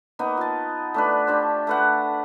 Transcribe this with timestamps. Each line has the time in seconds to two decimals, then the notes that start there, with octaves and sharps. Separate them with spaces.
0.19 A#3 B3 D#4
0.37 F4 A5
0.94 A3 D4 B4
1.27 D4 G4 C5
1.67 A3 B4 F#5